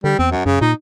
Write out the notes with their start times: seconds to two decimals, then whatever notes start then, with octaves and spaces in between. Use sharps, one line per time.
0.04 D3 G3
0.19 E2 C4
0.32 F#2
0.46 F#2 C#3
0.61 A#2 D#4